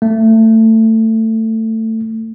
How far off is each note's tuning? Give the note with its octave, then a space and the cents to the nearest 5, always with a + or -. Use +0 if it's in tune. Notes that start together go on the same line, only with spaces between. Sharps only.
A3 +20